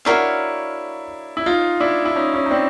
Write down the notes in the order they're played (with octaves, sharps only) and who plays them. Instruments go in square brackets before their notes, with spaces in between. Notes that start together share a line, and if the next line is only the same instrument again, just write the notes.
[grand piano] D4 E4 [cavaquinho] F#4 A#4 C#5 F5
[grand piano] E4
D#4 F4
D4 E4
E4
C#4 D#4
C#4 D#4
D#4
C4 D4